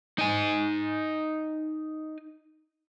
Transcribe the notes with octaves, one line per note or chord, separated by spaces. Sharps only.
D#4 G#5